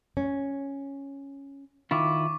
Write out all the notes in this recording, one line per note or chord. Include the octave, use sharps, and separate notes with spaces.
C#4
D#3 E4 F4 C#6 D6